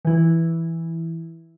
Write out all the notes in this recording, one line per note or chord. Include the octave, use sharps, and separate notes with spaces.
E3 E4